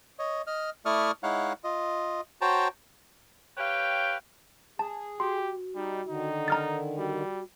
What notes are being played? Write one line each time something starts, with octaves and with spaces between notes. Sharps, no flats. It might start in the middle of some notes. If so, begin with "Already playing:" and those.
C#5 D#5
D#5 F6
A3 E4 D5 C#6 D#6 F6
G#3 D#4 E4 C#5 F5 F#5
F4 D#5
F#4 C5 C#5 G5 A5 A#5
G4 B4 C#5 F5 G5
G#4 A5
F#4 G4 C6
G3 D#4
D3 D#3 D#4
A#5 F6 A6
G3 F#4